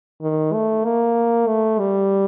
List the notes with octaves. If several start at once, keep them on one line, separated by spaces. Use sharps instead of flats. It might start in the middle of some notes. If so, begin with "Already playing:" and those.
D#3
A3
A#3
A3
G3